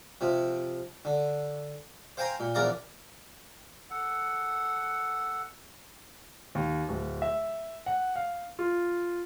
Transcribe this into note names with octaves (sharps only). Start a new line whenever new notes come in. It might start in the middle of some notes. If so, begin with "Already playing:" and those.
C3 F3
D3
C5 F5 G5 G#5 A#5 C6
A#2
A#1 E2 A#4 D5 F5 A#5
A4 F#5
D#2
D1
E5
F#5
F5
F4